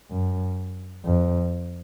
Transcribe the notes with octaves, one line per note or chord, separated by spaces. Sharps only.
F#2
F2